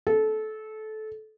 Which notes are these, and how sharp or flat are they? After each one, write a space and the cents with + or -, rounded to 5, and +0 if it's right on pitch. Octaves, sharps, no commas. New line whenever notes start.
A4 -20